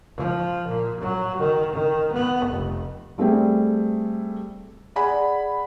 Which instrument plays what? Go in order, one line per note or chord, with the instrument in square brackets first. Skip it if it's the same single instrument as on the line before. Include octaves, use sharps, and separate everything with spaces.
[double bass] F3
A#2
F#3
D#3
D#3
B3
F1
[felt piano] G3 A3 C4 G#4 G5
G#4 D5 F#5 G#5 B5